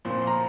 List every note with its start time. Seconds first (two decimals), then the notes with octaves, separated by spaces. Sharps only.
0.05 A#2 F3 C4 C6
0.22 C6
0.27 A#5